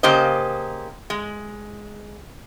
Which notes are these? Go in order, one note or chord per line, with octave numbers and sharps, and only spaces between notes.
C#3 A#3 G4 C5 D#5
G#3